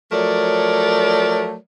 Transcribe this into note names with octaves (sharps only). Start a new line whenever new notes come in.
F3 F#3 A3 A#4 C#5 D5